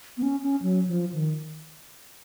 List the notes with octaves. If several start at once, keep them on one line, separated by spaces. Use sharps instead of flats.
B3
C#4
C#4
F#3
F3
D#3